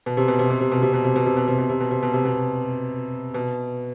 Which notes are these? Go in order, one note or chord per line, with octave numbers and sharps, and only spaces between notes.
B2
C3
B2
C3
B2
C3
B2
C3
B2
C3
B2
C3
B2
C3
B2
C3
B2
C3
B2
C3
B2
B2